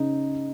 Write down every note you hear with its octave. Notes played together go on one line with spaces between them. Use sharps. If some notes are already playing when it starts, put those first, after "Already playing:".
Already playing: C#3 D#4